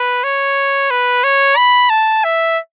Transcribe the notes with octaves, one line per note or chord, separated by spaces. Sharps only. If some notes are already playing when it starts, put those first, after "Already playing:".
Already playing: B4
C#5
B4
C#5
B5
A5
E5